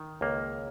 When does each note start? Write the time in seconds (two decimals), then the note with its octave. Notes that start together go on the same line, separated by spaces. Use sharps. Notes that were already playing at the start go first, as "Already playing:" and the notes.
Already playing: D#3
0.21 C#2 A#3